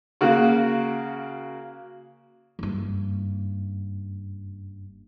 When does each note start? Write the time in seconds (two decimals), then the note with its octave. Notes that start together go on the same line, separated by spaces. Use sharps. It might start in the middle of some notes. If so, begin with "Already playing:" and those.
0.21 C#3 A#3 F#4
2.59 F#1 G2